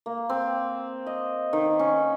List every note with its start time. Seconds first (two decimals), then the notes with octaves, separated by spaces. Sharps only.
0.06 A#3
0.30 C4
1.07 D#5
1.53 D#3
1.79 C#4